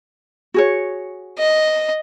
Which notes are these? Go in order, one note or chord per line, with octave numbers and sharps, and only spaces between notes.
F#4 G#4 C#5
D#5